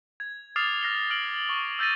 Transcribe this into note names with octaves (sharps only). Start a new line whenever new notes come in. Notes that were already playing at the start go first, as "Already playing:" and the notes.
G#6
D6 D#6 F6 A6 C7 F7
F6 A#6 C7 G7
F6 D7 F#7 G7
C#6
E6 G6 A6 A#6 D#7